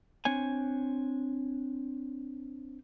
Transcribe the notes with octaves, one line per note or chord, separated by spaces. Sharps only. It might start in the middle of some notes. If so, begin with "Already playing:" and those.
C4 D4 C#5 G#5